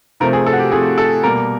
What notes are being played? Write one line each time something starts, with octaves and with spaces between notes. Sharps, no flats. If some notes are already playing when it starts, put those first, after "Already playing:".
C3 F3 A3 C4 A#4
G#4
A4
F#4
G4
C3 F3 A3 C4 G#4
A4
B2 G3 A#3 A#4